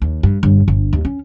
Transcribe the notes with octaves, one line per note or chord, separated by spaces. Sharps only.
D#2
G2
G1
G1
D#2
C#4